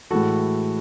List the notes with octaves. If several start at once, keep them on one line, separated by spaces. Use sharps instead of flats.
A2 E3 G#3 F#4 A4